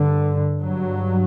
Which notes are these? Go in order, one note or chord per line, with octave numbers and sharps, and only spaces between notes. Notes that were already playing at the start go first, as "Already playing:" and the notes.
Already playing: G2 D3
G2 F#3